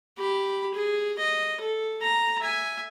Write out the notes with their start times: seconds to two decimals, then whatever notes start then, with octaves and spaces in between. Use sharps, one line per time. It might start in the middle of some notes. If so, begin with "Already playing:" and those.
0.18 G4 B5
0.74 G#4
1.19 D#5
1.60 A4
2.02 A#5
2.41 E5 G#5